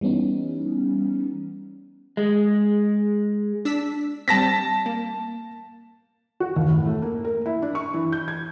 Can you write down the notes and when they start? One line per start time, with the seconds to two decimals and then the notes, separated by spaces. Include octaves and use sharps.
0.01 E3 G3 B3 C#4 D#4
2.17 G#3
3.65 D4 E6 B6
4.28 G3 C4 A5 A#6 B6
4.86 A#3
6.40 F#4
6.56 D#2
6.70 A2
6.86 A3
7.02 A#3
7.25 A#4
7.46 E4
7.62 D4
7.75 C#6
7.94 E3
8.12 G6
8.28 G#6